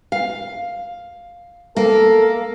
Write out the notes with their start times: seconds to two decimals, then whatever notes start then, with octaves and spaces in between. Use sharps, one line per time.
0.12 F5
1.76 A#3 A4